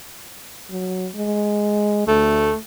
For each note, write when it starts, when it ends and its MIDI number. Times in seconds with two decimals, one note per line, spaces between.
0.71 1.09 54
1.16 2.05 56
2.08 2.50 38
2.08 2.57 57